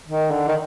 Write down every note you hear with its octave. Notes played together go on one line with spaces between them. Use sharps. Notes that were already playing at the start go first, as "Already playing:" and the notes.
D#3
D3
D#3